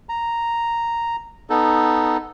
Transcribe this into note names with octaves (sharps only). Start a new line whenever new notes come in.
A#5
B3 D#4 A4